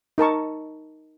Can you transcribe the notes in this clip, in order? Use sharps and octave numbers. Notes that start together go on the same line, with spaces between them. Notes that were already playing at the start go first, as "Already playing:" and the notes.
D#4 A#4 A5 C#6